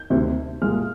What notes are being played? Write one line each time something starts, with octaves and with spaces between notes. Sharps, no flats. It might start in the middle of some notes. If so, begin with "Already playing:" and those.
Already playing: G6
D2 C3 D#3
C2 A#2 G#3 F6